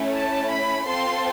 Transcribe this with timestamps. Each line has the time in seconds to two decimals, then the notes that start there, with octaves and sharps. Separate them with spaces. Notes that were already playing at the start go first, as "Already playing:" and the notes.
Already playing: A3 C#4 E4
0.15 A5
0.50 B5
0.86 C4 F4 A4 C6